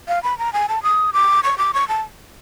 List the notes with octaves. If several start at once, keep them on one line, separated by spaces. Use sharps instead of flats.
F5
B5
A#5
G#5
A5
D#6
D6
C#6
D6
C#6
A5